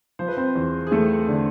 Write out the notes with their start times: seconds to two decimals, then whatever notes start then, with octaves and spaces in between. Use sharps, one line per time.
0.19 F3 C5
0.28 B4
0.37 C4 C5
0.56 E2
0.87 G#4
0.92 E2 A3 A4
1.28 D3